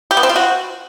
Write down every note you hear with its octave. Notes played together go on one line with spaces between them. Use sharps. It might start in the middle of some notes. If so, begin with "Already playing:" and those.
G4
B3
C4
F4
F#4